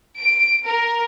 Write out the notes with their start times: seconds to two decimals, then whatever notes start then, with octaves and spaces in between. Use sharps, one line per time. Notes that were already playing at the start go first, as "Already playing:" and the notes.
0.20 D7
0.67 A#4